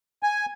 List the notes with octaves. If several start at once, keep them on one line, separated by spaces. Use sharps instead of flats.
G#5